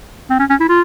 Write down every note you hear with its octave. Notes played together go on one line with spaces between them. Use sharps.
C4
C#4
C#4
E4
F4